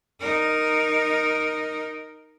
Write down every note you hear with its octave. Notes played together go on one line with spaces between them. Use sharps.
D#4 A#4